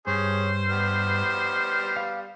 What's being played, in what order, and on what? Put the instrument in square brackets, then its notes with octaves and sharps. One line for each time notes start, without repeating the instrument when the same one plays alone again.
[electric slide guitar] G2 [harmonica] C#4 G#4 [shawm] C5
[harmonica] G3 B3 F6
[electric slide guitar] F5